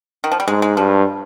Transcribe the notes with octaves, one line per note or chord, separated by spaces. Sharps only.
D#3
F3
G3
G#2 G#3
G#3
G2 F3